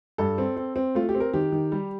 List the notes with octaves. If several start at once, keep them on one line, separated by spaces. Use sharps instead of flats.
G2 A4
C4
C4
C4
A3 F4
G4
C4
A#4
D#3 G4
D#3
G3